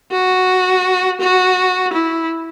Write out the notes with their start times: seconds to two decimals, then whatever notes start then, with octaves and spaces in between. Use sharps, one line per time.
0.12 F#4
1.21 F#4
1.94 E4